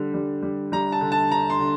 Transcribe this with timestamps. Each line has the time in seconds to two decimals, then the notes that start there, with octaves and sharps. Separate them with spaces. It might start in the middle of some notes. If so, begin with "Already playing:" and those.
Already playing: D3 G3
0.14 G3
0.42 G3
0.72 G3 A#5
0.92 A5
1.01 D3
1.12 A5
1.30 D3 A#5
1.50 C6
1.60 D3